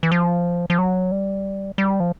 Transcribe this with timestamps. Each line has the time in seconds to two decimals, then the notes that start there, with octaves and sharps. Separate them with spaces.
0.03 E3
0.12 F3
0.70 F3
0.78 F#3
1.11 G3
1.78 G3
2.00 F3